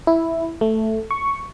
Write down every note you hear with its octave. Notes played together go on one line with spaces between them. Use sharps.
E4
A3
C#6